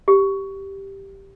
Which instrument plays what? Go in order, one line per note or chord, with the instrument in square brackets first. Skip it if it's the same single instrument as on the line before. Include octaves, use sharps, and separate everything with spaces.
[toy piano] G4